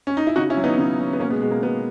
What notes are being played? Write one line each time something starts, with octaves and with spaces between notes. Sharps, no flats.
C#4
D#4
E4
C#3 D#4 F#4
C#4 E4
F#3
B3 D#4
C#3
F#3
B3
B2 A#3 C#4
G#3 B3
B2 G#3
A#3
B2 G#3 B3